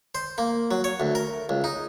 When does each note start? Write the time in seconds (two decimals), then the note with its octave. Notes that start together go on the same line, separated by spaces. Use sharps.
0.15 C5
0.38 A#3
0.71 F#3
0.84 C#5
1.00 D2
1.15 A#4
1.49 C#2
1.64 D#4